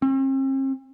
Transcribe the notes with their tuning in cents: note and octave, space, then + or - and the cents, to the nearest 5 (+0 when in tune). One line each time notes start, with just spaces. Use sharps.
C4 +45